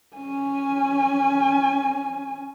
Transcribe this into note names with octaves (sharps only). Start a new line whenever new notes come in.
C#4 G#5